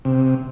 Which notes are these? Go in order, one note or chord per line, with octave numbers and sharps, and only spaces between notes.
C3